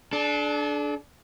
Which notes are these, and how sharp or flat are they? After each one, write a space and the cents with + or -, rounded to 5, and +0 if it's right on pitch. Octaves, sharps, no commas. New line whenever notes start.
D4 +0 A4 -45